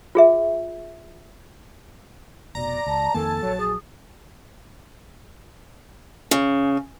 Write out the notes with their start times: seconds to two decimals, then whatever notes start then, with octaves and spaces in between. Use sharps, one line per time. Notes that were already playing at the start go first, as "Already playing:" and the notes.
0.15 F4 G#4 E5
2.55 F1 B2 D5 A#5
2.86 C#2 A5
3.14 F2 D#3 A#3 A4 G#5 A5
3.43 A#1 F#3 C#5
3.59 G#4 D#6
6.31 C#3